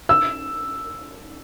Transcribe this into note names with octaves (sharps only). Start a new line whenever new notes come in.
E6